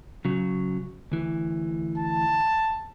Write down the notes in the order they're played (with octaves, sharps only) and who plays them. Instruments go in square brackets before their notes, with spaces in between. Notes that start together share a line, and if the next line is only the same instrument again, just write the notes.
[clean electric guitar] C#3 F#3
D2 E3
[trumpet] A5